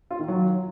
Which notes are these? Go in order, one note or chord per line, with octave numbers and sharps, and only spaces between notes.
F4
D#3
F#3